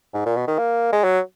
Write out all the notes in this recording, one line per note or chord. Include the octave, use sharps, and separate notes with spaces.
G#2
A#2
B2
D#3
A#3
G#3
F#3